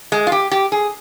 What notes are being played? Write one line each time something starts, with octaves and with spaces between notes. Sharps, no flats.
G#3
F4
G4
G4
G#4